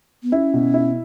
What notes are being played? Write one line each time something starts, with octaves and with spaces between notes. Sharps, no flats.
B3
C#4 E4
B2
E4